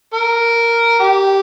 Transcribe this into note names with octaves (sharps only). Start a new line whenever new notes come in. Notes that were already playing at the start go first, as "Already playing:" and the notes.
A#4
G4